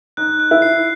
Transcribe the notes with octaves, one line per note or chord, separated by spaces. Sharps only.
D#4 F#6
F#6
E4
C7